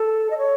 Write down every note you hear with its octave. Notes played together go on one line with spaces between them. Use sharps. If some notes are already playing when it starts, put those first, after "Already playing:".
Already playing: A4
D#5
C#5